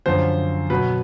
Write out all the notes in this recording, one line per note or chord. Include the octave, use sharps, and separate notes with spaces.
F#2 D3 F3 C5
B2 F#3 B4